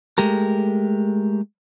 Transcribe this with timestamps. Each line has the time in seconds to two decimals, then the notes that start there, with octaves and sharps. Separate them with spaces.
0.18 G#3 A3 G4 A#4